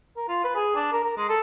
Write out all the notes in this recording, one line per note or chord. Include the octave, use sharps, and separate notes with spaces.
A#4
F4
B4
G#4
D4
A#4
A#4
G#3
A4